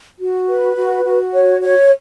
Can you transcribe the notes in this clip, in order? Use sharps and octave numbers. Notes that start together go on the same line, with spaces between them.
F#4
B4
F#4
F#4
C#5
C#5